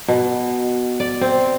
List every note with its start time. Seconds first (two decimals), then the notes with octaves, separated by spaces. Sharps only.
0.08 B2
1.00 D5
1.21 C4